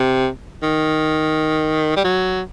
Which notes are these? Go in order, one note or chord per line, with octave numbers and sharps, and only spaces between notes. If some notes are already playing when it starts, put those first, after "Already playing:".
Already playing: C3
D#3
G3
F#3